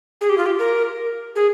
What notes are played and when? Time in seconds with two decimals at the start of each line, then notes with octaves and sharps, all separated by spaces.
0.21 G#4
0.29 G4
0.38 F4
0.46 G4
0.59 A#4
1.36 G#4